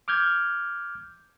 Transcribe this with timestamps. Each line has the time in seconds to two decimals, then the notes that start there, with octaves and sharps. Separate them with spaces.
0.08 D6 F6 G6 G#6